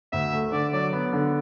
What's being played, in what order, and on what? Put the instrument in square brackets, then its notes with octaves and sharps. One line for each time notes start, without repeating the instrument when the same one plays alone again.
[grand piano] D2 [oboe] E5
[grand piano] A3
[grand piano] D3 [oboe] D5
[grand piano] F#3 [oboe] D5
[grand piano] B3
D3